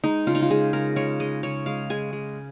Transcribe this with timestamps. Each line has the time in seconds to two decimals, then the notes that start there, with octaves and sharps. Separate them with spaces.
0.04 G#3 D#4
0.27 C#3 F4
0.35 D#4
0.42 F4
0.51 G#3 G#4
0.73 C#3 A#4
0.96 G#3 C#5
1.20 G#3 D#5
1.43 C#3 C#5
1.66 G#3 F5
1.90 G#3 G#5
2.13 G#3